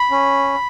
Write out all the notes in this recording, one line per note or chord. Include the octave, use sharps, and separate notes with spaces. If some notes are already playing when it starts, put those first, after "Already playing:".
Already playing: B5
C#4